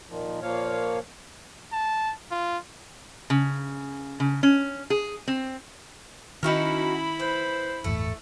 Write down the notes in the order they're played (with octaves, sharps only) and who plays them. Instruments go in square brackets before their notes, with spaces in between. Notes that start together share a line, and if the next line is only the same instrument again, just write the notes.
[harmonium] A#2 D#3 F3
A#2 F3 A#3 C#5 F5
[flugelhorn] A5
F4
[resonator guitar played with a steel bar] C#3
C#3
C#4
G#4
C4
[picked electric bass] D#3 [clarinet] C#4 [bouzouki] D#4 F#4 A#4 [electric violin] E4 B5
[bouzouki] B4 [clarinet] C5
[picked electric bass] G1 E2 A2 [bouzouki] A3